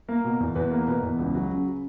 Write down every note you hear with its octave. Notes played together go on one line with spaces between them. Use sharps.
A#3
B2
E2
E2 B4
A#3
B2 B4
E2
C#2
F#3
C#3